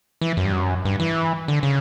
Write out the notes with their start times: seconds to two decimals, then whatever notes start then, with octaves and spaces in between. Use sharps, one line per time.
0.21 E3
0.37 F#2
0.45 G2
0.53 F#2
0.85 G2
1.00 E3
1.48 D3
1.63 C#3